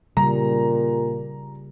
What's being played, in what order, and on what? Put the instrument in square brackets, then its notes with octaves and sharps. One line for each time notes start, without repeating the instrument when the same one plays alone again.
[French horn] A#2 [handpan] C#3 G3 [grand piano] A#5